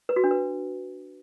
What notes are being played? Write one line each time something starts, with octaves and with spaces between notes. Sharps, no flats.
B4
F#4
D4
B4